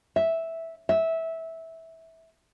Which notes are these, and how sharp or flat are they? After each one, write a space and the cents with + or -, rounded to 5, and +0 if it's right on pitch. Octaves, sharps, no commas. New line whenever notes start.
E5 -5
E5 -15